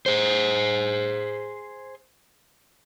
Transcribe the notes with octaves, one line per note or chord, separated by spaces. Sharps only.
G#4 C5